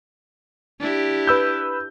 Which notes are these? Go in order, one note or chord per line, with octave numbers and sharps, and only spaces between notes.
D4 E4 G4
B4 E6 G6